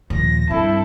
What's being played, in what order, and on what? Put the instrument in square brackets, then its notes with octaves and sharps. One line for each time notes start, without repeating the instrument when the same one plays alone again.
[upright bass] D#2 A#2 [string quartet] F3 A#6
[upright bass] G2 [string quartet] C4 A4 A5 [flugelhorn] E4